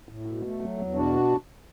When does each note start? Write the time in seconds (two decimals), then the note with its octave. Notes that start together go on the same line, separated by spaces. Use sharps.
0.09 A2
0.26 B2
0.43 A3
0.60 F#3
0.78 E2
0.95 B2 D4 F#4